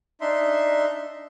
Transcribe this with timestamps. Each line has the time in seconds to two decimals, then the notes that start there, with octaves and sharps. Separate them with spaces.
0.21 D4 D#4 E5 C6